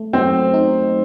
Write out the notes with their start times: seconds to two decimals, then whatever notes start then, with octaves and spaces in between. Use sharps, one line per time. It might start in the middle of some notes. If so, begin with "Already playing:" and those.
Already playing: A3
0.13 F#3 C4 C5
0.54 D#4